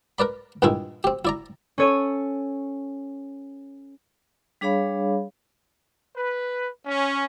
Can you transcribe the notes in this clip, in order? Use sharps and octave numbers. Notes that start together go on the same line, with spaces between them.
A#4 B4 D5 B5
G2 A#2 D#3 G#3 D#4 E4
C4 G4
E4 D5 A#5
C#4 A4 C#5 D#7
G3 D4 G#4 C#5 F5 B5
B4
C#4